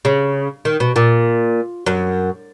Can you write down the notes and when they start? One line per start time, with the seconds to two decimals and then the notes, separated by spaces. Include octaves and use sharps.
0.05 C#3
0.65 D#3
0.80 B2
0.96 A#2
1.86 F#2